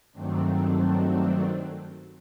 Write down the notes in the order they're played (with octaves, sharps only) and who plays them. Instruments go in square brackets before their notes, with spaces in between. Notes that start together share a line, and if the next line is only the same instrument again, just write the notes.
[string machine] G2 D#3 F#3 A3 C4 D4